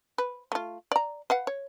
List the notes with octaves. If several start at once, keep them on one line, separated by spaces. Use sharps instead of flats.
B4
A3 F4
D5 A#5
B4 F5 F#5
C#5